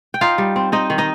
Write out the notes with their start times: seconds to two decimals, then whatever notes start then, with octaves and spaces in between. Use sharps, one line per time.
0.14 G5
0.21 D#4 F4 F5
0.38 G3
0.56 C4
0.72 C4 D#4 D#5
0.90 D#3
0.98 D#4 D#5